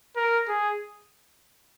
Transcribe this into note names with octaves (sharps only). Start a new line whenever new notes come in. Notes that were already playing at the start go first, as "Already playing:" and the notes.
A#4
G#4